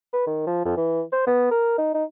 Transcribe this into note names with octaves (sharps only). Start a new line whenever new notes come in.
B4
D#3
F3
F2
E3
C5
B3
A#4
D#4
D#4